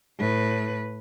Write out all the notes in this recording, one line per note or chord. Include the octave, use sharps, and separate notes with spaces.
A2 B4